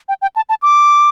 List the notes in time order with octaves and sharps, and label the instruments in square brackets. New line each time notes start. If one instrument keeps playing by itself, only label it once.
[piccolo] G5
G5
A5
A5
D6